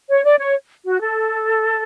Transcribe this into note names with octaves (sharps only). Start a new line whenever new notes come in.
C#5
D5
C#5
F#4
A4